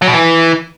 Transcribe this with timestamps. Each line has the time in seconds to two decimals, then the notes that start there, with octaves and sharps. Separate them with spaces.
0.02 F#3
0.08 B2
0.14 E3